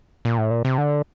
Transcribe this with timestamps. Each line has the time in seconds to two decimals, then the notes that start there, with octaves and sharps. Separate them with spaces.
0.25 A#2
0.38 A2
0.51 A#2
0.65 C3
0.78 D3